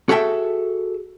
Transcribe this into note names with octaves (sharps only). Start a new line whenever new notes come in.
F#4 G#4 A4 E5 G5